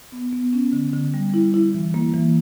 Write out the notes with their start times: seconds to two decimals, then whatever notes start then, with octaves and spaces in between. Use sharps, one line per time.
0.12 B3
0.33 B3
0.53 C#4
0.73 D3
0.93 D3
1.14 G3
1.34 E4
1.54 E4
1.74 E3
1.94 A#3
2.14 E3